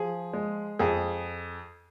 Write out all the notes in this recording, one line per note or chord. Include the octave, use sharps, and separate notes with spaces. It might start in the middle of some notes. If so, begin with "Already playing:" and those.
Already playing: F3 G#4
G#3
F2 G#4